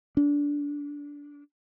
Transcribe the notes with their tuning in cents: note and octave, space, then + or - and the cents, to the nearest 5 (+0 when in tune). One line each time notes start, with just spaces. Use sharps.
D4 -20